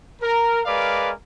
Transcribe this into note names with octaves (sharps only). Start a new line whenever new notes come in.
A#4
G#3 A#4 B4 D5 F5 D6